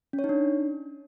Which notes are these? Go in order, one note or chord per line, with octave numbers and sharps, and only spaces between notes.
C#4
C#5
D#4
D4